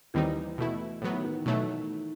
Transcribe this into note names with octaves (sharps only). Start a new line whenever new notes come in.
D#2 D#3 E3 G3 C4 D#4
B2 A3 E4
A2 E3 F#3 B3
D#3
D#3
E3
B2 F#3 A3